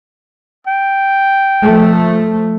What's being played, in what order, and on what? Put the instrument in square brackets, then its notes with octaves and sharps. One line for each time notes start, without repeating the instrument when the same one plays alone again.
[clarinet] G5
[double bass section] F3 A3